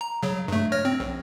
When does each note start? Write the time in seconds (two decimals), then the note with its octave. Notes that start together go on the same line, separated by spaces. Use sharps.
0.01 A#5
0.23 C#3 F#3
0.48 G2 A3
0.72 C#5 F6 A#6
0.85 C4
1.00 A#1